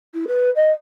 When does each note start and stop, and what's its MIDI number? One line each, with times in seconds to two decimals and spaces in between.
0.14 0.25 64
0.28 0.50 71
0.56 0.71 75